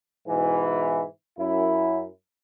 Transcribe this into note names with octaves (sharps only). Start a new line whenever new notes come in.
G#2 B2 E3
F#2 E4